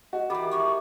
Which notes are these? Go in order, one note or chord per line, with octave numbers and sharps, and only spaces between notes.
F#4 D#5
D#3 E3 G4 B5 D6
G#3 D#4 E4 C#6